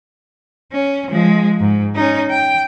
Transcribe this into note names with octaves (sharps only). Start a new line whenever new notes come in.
C#4
F3 G#3
G#2
C#4 D#4
G5